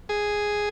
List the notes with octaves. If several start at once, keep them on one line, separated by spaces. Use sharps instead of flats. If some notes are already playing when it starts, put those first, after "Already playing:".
G#4